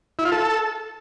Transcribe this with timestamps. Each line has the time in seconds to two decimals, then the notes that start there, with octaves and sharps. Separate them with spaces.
0.19 E4
0.25 F4
0.32 A4